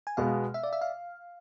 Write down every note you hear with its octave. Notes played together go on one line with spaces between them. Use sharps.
G#5
B2 G#3 B3 F5
E5
D5
E5
F5